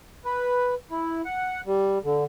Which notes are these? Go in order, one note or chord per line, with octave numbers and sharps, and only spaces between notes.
B4
E4
F#5
G3
D3